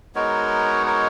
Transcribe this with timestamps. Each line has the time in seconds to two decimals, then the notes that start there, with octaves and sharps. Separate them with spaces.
0.15 G#3 B3 D#4 F#4 A#4 C#5
0.86 A#4 C#5